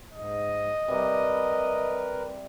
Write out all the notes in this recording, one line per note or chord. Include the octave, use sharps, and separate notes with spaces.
G#2 D#5
C3 G3 A#4 B4